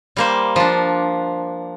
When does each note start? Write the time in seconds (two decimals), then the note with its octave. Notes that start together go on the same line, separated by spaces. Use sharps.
0.17 G3 A#3 C5
0.56 F3 D4